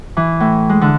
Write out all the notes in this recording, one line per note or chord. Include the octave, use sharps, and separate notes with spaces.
E3
A2
G#3
D3